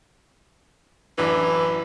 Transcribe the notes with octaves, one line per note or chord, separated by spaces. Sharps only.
A1 F#2 E3 D4